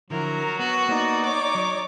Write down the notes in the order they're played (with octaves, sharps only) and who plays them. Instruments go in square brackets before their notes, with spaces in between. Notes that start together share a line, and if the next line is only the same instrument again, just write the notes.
[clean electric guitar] D3 F3 E4 [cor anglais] F#3 [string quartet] A#4
[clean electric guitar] B3 [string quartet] F#4
[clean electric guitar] A#3 B3 [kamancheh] D#4 D5
[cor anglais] C#5 [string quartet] D6
[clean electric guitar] F#3